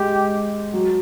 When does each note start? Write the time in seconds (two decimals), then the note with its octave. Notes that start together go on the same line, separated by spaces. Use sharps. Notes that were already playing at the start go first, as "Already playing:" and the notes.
Already playing: G#3 G4
0.74 F#3